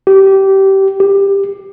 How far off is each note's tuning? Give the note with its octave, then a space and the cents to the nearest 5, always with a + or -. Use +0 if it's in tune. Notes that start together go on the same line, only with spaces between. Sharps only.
G4 -20
G4 +15